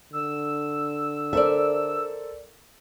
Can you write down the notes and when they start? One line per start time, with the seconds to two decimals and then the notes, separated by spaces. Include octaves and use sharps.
0.13 D3 E6
1.33 A4 A#4 C5 D5 E5